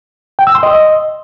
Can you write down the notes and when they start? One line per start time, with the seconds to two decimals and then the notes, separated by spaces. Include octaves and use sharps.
0.39 G5
0.47 E6
0.55 C6
0.63 D#5